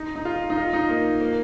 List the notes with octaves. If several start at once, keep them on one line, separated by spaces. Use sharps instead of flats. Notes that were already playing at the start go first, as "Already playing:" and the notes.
Already playing: D#4
D#4
F4
D#4
F4
D#4
A#3
A#3